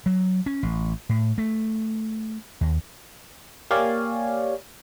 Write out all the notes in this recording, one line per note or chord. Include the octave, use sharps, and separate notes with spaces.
F#3
C#4
A1
A2
A3
D#2
A#3 G4 C#5 D5 F5 G#5